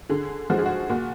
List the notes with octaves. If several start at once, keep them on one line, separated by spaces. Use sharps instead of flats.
D3 G#4
F3 G#3 F#4
G#4
F#4
A#2 F#4